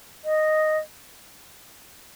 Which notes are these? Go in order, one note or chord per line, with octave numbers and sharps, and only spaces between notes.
D#5